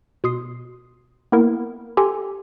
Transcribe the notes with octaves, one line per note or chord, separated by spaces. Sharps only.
B2 C6 D#6 C7
A#3 B3 E4 A#4
G4 A4 G5 G#5 A#5 C6